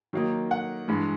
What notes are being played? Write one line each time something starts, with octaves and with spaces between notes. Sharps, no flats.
D#3 F#3 A#3 D#4
F#5
G2 E3 G#3